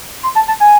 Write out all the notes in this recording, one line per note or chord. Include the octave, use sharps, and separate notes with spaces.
C6
A5
A5
G#5